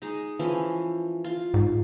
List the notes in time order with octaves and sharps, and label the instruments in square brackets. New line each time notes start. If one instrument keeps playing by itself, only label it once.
[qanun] G#3 D#4
E3 F3 C#4
F4
[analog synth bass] G#2